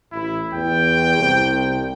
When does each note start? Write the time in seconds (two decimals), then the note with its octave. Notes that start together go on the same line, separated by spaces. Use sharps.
0.12 A1 E4
0.53 E2 G5
1.18 C2